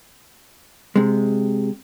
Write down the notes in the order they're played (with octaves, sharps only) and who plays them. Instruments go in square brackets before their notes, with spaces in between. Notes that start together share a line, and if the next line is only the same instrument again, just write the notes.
[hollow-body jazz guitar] C3 G#3